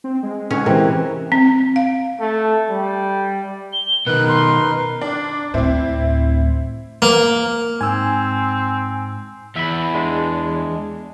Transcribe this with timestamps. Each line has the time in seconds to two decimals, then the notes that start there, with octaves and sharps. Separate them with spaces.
0.04 C4
0.23 G#3
0.51 D3 C#4
0.66 C3 E3 C4 A#4
1.32 C4
1.76 F5
2.20 A3
2.70 G3
3.73 G7
4.07 B2 D#3 D#4 A#4 B4 F#6
4.28 C6
5.01 D4
5.54 D2 A2 C4 E4
7.02 A#3
7.81 G#2 C4 G#5 E6
9.56 E2 E5 B5
9.94 G#3 D4